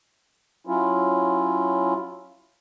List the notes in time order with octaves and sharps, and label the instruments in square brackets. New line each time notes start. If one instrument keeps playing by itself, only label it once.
[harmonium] F#3 C#4 E4 F4